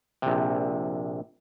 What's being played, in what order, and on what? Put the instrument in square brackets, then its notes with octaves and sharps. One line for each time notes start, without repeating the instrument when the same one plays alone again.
[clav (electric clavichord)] A#1 C3